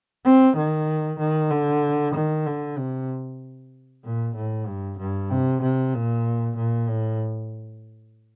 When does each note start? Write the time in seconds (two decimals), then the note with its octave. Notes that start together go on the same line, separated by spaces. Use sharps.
0.25 C4
0.57 D#3
1.19 D#3
1.50 D3
2.14 D#3
2.46 D3
2.77 C3
4.04 A#2
4.36 A2
4.67 G2
4.99 G2
5.30 C3
5.62 C3
5.94 A#2
6.57 A#2
6.89 A2